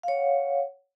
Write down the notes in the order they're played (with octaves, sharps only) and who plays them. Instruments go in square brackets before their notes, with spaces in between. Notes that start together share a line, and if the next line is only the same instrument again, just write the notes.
[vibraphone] F5
C#5
F#5